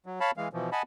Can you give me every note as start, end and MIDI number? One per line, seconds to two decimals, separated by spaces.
0.06 0.19 54
0.20 0.31 73
0.20 0.31 77
0.20 0.31 81
0.20 0.31 83
0.37 0.48 52
0.37 0.48 56
0.37 0.48 77
0.53 0.70 47
0.53 0.70 52
0.53 0.70 53
0.72 0.82 75
0.72 0.82 78
0.72 0.82 80
0.72 0.82 81
0.72 0.82 83